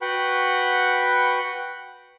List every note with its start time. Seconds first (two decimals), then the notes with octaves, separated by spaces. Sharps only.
0.02 F#4 B4 F#5 G5 B5 C#6